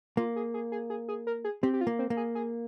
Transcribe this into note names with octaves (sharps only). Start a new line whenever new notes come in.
A#3 F4
G#4
G#4
G#4
G#4
G#4
A#4
G#4
C4 G4
G4
F4
A#3
C4
A#3
G#4
G#4